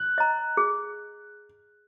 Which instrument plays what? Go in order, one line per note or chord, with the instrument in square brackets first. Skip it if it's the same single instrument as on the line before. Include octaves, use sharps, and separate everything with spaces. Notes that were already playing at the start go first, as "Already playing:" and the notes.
Already playing: [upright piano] F#6
[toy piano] D#5 A#5
G#4